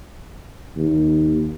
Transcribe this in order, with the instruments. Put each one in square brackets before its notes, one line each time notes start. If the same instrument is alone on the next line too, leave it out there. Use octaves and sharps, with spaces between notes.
[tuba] D#2